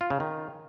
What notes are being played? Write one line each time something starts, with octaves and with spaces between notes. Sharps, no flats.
F4
C#3
D#3